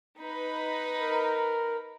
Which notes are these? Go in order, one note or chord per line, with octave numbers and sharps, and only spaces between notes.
D#4 B4 B5
A#4